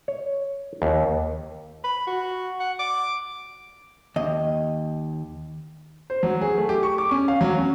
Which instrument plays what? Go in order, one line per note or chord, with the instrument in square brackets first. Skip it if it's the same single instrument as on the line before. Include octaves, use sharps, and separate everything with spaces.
[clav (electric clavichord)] C#5
D#2
[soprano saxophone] B5
F#4
F#5
D6
[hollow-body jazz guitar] D#2 D#5
[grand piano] C5
F#3
G#4
A3
G4
C#6
D6
C#4
F5
F#3
C#4